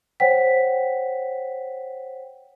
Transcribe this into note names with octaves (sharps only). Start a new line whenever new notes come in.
C5 C#5 F#5 G5 B6